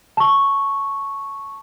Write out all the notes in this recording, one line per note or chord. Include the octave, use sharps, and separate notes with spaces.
A5 C#6